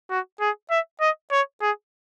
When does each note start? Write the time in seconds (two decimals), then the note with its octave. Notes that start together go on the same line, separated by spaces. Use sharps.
0.10 F#4
0.41 G#4
0.71 E5
1.01 D#5
1.32 C#5
1.62 G#4